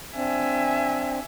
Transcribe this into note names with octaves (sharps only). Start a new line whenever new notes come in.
C4 D4 E5 G#5